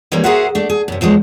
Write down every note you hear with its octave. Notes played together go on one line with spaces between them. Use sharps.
E3 F3 G3 G#3 A#3 C#4
F#4 G#4 A#4 C5 E5 F#5
A3 D4
G#4
F#2 C3
E2 F3 F#3 G#3